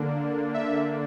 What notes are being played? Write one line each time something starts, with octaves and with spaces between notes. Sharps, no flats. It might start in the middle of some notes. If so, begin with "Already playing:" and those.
Already playing: D3 A#3 D4
E5